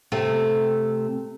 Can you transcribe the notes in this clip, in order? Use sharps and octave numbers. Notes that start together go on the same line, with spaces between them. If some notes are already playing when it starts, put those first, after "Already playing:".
C3 A3